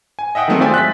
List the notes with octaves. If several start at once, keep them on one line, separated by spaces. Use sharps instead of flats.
G#5
D#5 E5 F#5 G5 D#6
D#3 F#3 G#3 A3 C4
F4 C5 D5 E5 G5 G#5
F#6 A6 B6